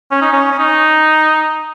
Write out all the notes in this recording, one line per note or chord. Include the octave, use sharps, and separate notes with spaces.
C#4
D#4
C#4
C#4
D#4